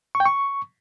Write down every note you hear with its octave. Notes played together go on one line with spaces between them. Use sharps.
C#6
G5
C#6